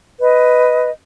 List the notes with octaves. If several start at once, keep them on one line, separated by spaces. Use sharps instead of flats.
B4 D#5